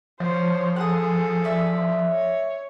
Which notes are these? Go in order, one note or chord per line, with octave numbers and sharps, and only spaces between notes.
F3 C5 C#5
G#4 A4 F#5 D#6
A3 D5 E5
C#5